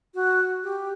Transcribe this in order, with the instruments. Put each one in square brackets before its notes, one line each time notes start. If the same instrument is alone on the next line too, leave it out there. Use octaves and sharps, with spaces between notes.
[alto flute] F#4
G4